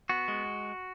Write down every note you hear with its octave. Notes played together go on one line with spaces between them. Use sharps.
B3 F#4
G#3